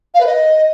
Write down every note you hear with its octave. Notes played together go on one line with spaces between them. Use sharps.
F5
B4
D#5